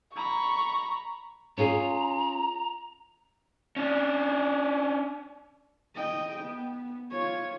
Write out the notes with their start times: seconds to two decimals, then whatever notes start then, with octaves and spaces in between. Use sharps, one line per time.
0.16 A#5 B5 C#6
1.58 C#4 F4 G#4 A#5
3.76 C#4 D4
5.95 D#5 G5
6.44 B3
7.11 F4 C#5